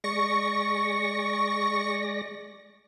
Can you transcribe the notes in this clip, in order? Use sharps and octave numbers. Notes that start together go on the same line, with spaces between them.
G#3 D5 C#6 A#6